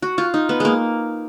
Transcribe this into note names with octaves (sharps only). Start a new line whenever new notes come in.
F#4
F4
D#4
B3
G#3 A#3